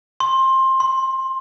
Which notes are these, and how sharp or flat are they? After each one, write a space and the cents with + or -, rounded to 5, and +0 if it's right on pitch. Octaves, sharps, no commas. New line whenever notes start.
C6 +20
C6 -10